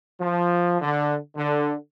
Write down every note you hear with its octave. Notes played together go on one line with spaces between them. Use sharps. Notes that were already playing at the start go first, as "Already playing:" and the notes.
F3
D3
D3